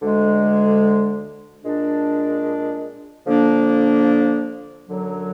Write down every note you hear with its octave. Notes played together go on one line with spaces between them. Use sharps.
D2 D3 G#3
A#2 G#3 D4
D3 F3 A#3 D4
F#2 D3 F#3